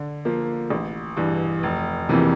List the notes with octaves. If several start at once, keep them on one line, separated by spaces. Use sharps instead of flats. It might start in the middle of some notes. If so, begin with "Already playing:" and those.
Already playing: D3
F3 A#3
A1
G2 E3
F1
F2 C3 E3 A#3